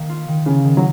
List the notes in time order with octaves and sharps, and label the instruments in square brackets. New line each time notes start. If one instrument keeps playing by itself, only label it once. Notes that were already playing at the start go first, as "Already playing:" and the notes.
Already playing: [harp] D#3 A#3
F4
D#3
[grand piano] C#3 [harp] A#3
[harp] D#3
[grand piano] F#3